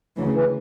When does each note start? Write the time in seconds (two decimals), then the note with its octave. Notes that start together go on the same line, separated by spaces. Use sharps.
0.18 D2 C#3 E3 F#3 A3
0.32 E3